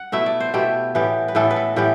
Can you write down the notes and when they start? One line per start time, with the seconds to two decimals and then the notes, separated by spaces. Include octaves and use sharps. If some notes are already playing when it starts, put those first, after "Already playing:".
Already playing: F#5
0.12 B2 A3 E4 E5
0.26 D5
0.40 C5
0.54 B2 A3 E4 G4
0.95 A2 E3 B3 G4
1.28 B4
1.35 A2 E3 B3 A4
1.51 B4
1.56 A4
1.76 A2 E3 B3 G4